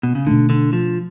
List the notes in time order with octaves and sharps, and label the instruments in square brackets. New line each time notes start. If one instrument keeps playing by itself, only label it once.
[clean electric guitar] B2
C#3
[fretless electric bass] B2 A3 D4 [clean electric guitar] D3
[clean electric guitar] D3
F3